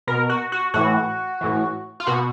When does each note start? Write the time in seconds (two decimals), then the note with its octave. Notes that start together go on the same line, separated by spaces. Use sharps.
0.07 B2 A#4
0.30 F#4
0.52 F#4
0.74 A2 E3 F#4
1.41 A2 E3
2.00 F4
2.07 B2 F#4